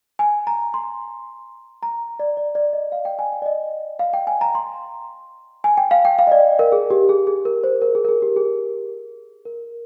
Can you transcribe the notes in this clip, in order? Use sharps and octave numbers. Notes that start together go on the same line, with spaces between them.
G#5
A#5
C6
A#5
D5
D5
D5
D#5
F5
G5
G#5
G5
D5
D#5
F5
G5
G#5
A#5
C6
G#5
G5
F5
G5
F5
D#5
D5
A#4
G#4
G4
G#4
G#4
A#4
C5
A#4
G#4
A#4
G#4
G4
G#4
A#4